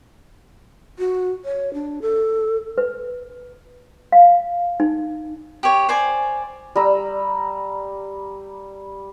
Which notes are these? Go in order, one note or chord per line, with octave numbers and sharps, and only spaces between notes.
F#4
C#5
D4
A4
B4
F5
D#4
G4 C#5
C5 D5 G#5
G3 A#5 E6